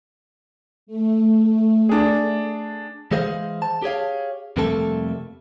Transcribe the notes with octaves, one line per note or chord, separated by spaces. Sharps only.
A3
D4 G#4
E3 G#3 G#4 C5 F5
A5
G4 G#4 C#5 F5
F2 C3 G3 A3 A#3 A4